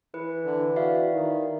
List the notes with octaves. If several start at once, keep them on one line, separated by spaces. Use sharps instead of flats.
E3 B4
D3
F#4 D5 E5 F5
D#3